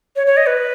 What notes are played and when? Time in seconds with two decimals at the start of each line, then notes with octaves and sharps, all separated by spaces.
0.16 C#5
0.27 C#5
0.37 D#5
0.47 B4